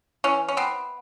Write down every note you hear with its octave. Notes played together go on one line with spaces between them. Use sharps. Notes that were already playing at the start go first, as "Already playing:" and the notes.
E3 C#4
C#4
B3 C4